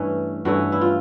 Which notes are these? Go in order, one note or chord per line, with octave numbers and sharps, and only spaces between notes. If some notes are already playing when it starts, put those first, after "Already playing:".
Already playing: G2 E3 A3 C#4
G2 E3 A3 C#4 F#4
E4
F4